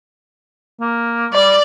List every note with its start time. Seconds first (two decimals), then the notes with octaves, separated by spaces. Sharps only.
0.81 A#3
1.33 G3 D5